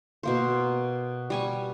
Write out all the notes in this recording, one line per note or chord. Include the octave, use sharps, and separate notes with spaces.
B2 A#3 C5
G3 G#5 C#6